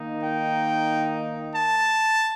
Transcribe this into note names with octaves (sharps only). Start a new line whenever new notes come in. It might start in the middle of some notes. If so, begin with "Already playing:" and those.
Already playing: D#3 A#3 D#4
G5
A5